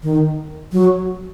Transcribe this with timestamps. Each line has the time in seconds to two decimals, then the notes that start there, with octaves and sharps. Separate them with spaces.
0.03 D#3
0.72 F#3